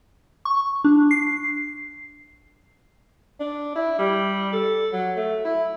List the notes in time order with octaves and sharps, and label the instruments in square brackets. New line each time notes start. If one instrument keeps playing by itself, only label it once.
[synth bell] C#6
D4
C7
[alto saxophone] D4
E4
G3
A4
F#3
A3
E4